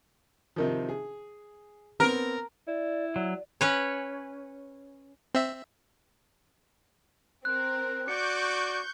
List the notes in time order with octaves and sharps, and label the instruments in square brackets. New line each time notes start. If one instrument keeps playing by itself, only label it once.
[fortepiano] C3 D#3 F3
G#4
[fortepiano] B3 C4 [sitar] A#4
[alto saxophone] E4 [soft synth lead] D5
[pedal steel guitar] F#3 [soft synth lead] D5
[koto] C#4 B4 C#5
[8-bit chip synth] C4 E5
[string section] C4 A#4 [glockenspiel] F#6
[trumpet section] F#4 D5 D6 [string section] C#6 G6 [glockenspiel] C#7